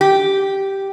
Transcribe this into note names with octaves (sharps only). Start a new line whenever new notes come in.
G4